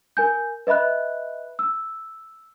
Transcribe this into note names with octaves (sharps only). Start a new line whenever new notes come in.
A#4 G#5 G6
B4 D#5 E5 B5 F#6
E6